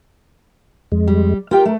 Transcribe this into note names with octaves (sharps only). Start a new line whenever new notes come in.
F2 G#3
G3
F4 G4 A#4 G5
A3